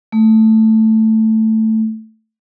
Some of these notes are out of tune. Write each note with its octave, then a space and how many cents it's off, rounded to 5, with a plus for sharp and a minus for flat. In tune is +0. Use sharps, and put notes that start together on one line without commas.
A3 +5